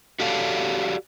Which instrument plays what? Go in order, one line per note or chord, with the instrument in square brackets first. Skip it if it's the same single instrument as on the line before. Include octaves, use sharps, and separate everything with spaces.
[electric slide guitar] F#4 G4 A4 C#5 D5 F5